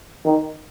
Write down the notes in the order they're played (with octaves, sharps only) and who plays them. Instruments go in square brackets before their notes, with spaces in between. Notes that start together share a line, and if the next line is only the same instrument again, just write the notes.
[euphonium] D#3